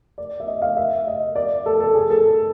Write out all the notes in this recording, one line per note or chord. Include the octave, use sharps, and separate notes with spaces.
D5
E5
D#5
F5
E5
D#5
D5
A4
A4
G#4
A4